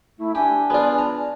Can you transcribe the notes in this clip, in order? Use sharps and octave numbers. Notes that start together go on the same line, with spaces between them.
A3 E4
D4 G4 G#5
B3 F4 G#4 D5
A#5